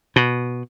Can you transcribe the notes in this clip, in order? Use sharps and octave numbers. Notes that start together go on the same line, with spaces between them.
B2